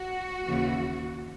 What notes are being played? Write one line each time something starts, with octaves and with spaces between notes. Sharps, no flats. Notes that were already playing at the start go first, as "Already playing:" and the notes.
Already playing: F#4
D#2 C#3 E3